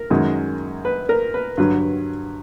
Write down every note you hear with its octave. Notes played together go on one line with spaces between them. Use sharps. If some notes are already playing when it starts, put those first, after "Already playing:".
Already playing: A#4
F#2 D#3 G#3
B4
A#4
B4
G2 D3 F#3 B4